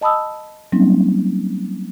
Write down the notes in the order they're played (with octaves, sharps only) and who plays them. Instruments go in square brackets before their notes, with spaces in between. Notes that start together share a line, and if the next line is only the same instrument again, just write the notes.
[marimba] D#5 A5 B5 D#6 E6
F#3 G3 A#3 C4 C#4 D#4